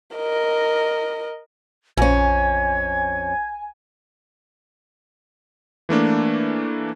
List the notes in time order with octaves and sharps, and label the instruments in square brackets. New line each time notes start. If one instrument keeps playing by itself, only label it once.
[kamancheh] A#4 D#5
[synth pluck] A#1 [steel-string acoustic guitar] F2 C#4 [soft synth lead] G#5 [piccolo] G#6
[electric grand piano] E3 A3 A#3 D4